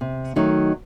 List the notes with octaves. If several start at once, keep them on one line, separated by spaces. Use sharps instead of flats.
C3
D#3 F#3 A3 D#4